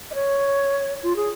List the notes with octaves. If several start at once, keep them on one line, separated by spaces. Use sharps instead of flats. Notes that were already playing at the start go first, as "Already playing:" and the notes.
D#5
C#5
F4
G#4